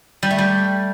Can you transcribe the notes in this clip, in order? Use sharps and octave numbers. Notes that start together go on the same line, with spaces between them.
G3
A3
G3